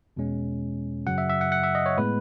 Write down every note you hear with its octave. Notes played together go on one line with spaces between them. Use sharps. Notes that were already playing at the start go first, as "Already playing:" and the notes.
E2 B2 G#3 C#4
F#2 C#3 F#3 F#5
E5
E5
F#5
F#5
E5
D#5
C#5
A2 G#3 B3 B4